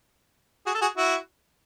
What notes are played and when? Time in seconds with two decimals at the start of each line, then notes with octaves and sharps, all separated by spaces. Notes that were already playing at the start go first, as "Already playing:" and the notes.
0.66 F#4 G#4
0.75 A4
0.81 F#4 G#4
0.97 E4 F#4